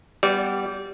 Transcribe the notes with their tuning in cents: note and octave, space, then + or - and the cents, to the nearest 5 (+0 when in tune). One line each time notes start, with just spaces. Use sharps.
G3 +0 B3 +0 D5 -25